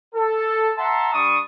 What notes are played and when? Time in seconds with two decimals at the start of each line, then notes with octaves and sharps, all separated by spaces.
0.14 A4
0.77 E5 F#5 A5 A#5 C6
1.12 G3 D4 C#6 D#6